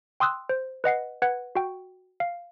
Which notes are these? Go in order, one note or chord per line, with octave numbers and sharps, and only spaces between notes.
G5 C6 D#6 E6 F#6
C5
B4 D#5 F#5 C7
B4 F#5 G#6
F#4 G5
F5